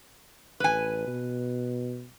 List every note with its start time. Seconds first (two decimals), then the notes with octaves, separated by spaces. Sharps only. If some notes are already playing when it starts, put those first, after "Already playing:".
0.60 A1 B4 G#5
1.07 B2